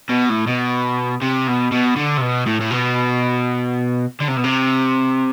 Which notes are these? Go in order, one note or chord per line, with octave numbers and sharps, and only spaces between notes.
B2
A2
B2
C3
B2
B2
D3
C3
B2
A2
A2
B2
D3
C3
B2
C3